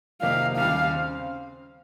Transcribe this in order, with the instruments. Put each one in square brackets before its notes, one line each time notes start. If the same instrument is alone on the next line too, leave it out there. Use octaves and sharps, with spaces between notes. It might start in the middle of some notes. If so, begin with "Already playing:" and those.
[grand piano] F2 C3 D#3 A#3 D#4 [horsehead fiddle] F5
[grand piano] D#2 C#3 G3 [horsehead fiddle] F5
[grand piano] C#3 C4